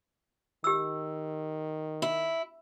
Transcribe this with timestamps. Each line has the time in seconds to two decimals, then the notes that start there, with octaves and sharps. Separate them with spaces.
0.64 D#3 G4 E6
2.02 E4